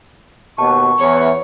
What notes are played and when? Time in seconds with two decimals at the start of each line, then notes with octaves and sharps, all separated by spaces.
0.58 D#2 B2 A5 C#6
0.99 E2 C#5